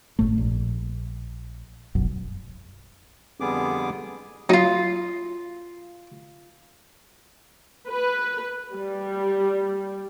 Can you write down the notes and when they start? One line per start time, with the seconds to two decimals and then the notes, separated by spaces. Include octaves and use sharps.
0.19 G#1 A2 A3
0.38 A#1
1.95 F1 B1 F#2
3.40 F2 D3 G3 B3 G#4 D6
4.49 F#3 D#4 F4
7.89 B4
8.73 G3